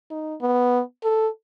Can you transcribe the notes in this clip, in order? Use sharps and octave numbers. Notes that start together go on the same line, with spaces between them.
D#4
B3
A4